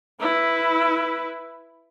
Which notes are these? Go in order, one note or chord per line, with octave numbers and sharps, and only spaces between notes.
E4 B4